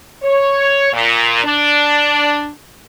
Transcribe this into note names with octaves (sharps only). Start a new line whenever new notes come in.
C#5
A#2
D4